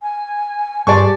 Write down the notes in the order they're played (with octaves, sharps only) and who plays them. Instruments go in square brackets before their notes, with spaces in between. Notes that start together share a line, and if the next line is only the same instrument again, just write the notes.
[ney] G#5
[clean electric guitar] G2 G#4 C6 [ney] G4 [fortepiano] D5 A5 C#6